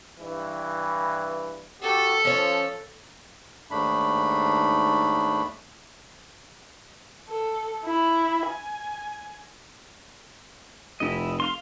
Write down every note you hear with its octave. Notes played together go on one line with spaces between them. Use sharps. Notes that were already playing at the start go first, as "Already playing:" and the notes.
G2 E3
F#4 G4 A4
F3 C#4 C#5
D#2 G#2 A3 D4 B5
A4
E4
G#5
F1 E4 D#5
F5 C6